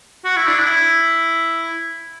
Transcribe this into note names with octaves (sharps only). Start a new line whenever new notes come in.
F#4
E4
D4
E4